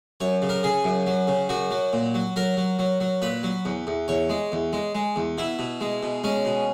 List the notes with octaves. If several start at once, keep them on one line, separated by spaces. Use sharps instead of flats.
F#2 C#5
C#3
A#4
C#3 G#4
F#2
F#3
C#3
F#2 F#4
F#3
A#2
F#3
F#3 A#4
F#3
F#3
F#3
A#2 B4
F#3
E2
E2
E2 C#5
G#3
E2
G#3
G#3
E2
B2 E4
B2
G#3
B2
G#3 C#4
B2